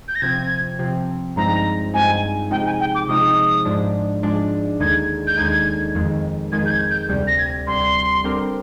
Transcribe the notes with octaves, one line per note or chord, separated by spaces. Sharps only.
G6
A#6
C3 F3 C4 G#6
C3 F3 C4
G2 F3 G#3 C4 D#4 A#5
G2 F3 G#3 C4 D#4 G#5
C3 F3 G#3 D#4 G5
G#5
G5
D6
C3 F3 G#3 D#4 D#6
G#2 F3 G#3 D4
G#2 F3 G#3 D4
D#2 D3 G#3 D#4 G#6
G6
D#2 D3 G#3 D#4 G#6
F2 D#3 G#3
F2 D#3 G#3 G#6
G6
G#6
G6
D2 C3 G3
A#6
G#6
D2 C3 G3 C6
D3 G3 C4 G4 A#4